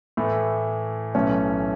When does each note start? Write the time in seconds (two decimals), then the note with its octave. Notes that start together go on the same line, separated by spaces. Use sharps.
0.17 A2 E3 A3 E4
1.15 B1 A2 E3 A3 C#4